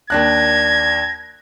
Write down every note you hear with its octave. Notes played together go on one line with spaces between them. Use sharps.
D#2 D4 F#6 G#6 A#6